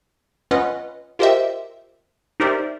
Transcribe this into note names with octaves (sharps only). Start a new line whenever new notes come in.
C#4 F4 B4 D#5 F#5
F4 G4 A#4 C5 D#5 E5
D#4 G4 A#4 C5 D5 E5